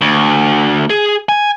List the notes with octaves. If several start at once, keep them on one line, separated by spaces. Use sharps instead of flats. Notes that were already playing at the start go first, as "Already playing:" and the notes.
D2
G#4
G#5